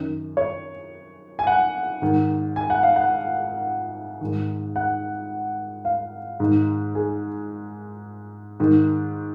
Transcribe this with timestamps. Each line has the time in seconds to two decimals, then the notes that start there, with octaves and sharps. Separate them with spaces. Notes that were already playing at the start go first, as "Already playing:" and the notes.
Already playing: F#2 D#3
0.37 C#5
1.39 G#5
1.47 F#5
2.02 G#2 D#3
2.56 G#5
2.70 F#5
2.83 F5
2.96 F#5
4.21 G#2 D#3
4.76 F#5
5.85 F5
6.40 G#2 D#3
6.95 G#4
8.60 G#2 D#3